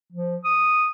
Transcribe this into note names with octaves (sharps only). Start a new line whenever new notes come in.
F3
D#6